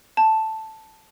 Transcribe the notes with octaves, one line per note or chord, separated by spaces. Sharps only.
A5